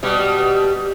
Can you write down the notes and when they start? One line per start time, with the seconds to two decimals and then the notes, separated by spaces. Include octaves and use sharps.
0.03 B2 G3